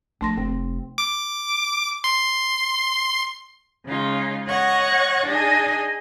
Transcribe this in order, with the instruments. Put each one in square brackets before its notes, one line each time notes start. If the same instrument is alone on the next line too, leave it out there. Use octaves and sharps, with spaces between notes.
[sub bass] A#1 [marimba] A3 C6 A#6 [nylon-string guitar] D4
[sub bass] F1 [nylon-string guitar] C4
[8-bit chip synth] D6
C6
[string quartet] C#3 G#3 D#4 F4
C#5 D#5 F#5 C#6 F#6 A#6
D4 D#4 G#4 D#5 G#5